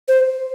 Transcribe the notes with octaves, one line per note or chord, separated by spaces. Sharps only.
C5